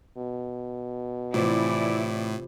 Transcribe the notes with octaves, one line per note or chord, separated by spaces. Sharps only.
B2
A2 C3 E3 E4 F4 C5 D5